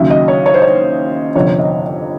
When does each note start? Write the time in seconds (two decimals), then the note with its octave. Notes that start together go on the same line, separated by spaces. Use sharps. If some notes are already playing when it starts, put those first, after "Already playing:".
Already playing: D#2 C#3 F#3 E5
0.10 D#5
0.28 C#5
0.46 C#5
0.54 C5
0.62 C#5
1.35 G1 F2 C3 C#5
1.59 D#5